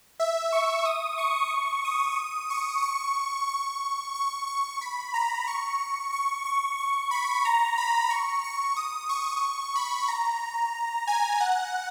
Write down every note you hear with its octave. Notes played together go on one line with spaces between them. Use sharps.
E5
C#6
D#6
C#6
D#6
C#6
C#6
C#6
C#6
C#6
B5
A#5
C#6
C#6
C#6
C#6
B5
A#5
B5
C#6
C#6
D#6
C#6
B5
A#5
G#5
F#5